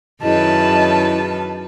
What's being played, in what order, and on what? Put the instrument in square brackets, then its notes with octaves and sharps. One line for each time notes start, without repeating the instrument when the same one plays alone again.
[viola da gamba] F#2 D#3 B4 [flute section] E4 G#4 D#5 [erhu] A5